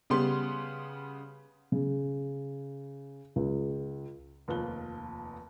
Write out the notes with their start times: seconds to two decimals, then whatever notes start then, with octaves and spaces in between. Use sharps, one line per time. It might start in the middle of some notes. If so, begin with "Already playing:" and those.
0.10 C#3 G3 B3 G4 C6
1.72 C#3
3.36 C#2
4.48 F1 D#2 F3 F4 F#6 G7